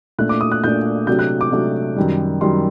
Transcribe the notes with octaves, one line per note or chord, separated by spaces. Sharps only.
A#2 A3 D4 F#6
D6
D#6
F#6
A#2 A3 D4 G6
C3 F#3 A3 D4 G6
F#6
D6
C3 F#3 A3 D4
F#2 D#3 G3
F#2 D#3 G3 C6